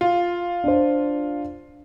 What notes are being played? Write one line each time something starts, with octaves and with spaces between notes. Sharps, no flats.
F4
D4 C5